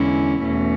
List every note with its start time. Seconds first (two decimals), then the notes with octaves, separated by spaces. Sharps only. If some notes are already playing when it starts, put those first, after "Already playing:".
Already playing: E2 D3 G#3 C#4 E4
0.44 E2 B2 A3 C#4